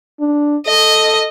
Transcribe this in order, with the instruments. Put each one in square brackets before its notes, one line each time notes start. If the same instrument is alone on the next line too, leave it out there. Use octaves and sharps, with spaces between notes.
[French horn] D4
[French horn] A4 [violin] D#5